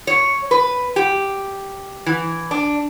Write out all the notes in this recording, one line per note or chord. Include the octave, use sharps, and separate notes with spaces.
C#5
B4
G4
E3
D4